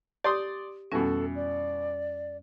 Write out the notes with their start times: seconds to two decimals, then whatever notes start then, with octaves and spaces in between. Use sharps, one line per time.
0.24 G4 D5 C6 D#6
0.92 F2 B2 E3 G3 C#4 A4
1.35 D5